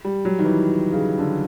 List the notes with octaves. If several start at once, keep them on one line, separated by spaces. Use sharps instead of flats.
G3
F#3
D#3
E3
C#3
D3